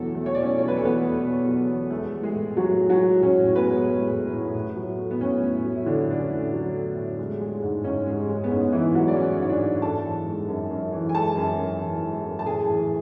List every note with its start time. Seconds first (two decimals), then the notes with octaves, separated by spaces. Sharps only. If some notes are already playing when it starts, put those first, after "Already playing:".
Already playing: E2 B2 F#3 A3 A4
0.15 A3
0.26 C#5
0.35 B2 D5
0.42 C#4 C#5
0.58 F#3 C#5
0.68 B4
0.76 A4
0.81 E2 B3 B4
1.02 A3
1.24 B2
1.47 F#3
1.68 E2
1.90 G#3 A3 A4
2.13 G#3
2.23 G#3 G#4
2.35 A2
2.56 A2 F#3 F#4
2.79 G#3
2.89 F#3 F#4
3.01 G#3
3.22 A2 C#4
3.44 A2
3.56 B3 B4
3.66 G#3
3.88 G#3
4.11 A2
4.33 A2
4.55 A2
4.76 F#3
4.99 A3
5.11 B3
5.20 A2 C#4
5.43 A2
5.65 F#3
5.75 E4
5.86 D3 A3 D4
6.08 A2 D4
6.19 C#4
6.31 A2
6.53 F#3
6.74 A3
6.96 A2
7.19 G#3
7.41 G#3
7.62 G#2
7.84 G#2 C#4
8.06 G#3
8.28 G#3
8.44 B3
8.51 G#2 C#4
8.72 G#2 E3 E4
8.94 F#3 G#3 F#4
9.08 D5
9.16 G#3 C#4 C#5
9.38 G#2 C#5
9.49 D4 D5
9.61 G#2
9.82 F#2 A4 A5
10.04 E3
10.26 G#3
10.48 F#2
10.70 F#2
10.93 E3
11.09 G#5
11.14 G#3 A4 A5
11.37 F#2
11.58 F#2
11.81 E3
12.02 G#3
12.24 F#2
12.39 A5
12.46 A2 G#4 G#5
12.69 E3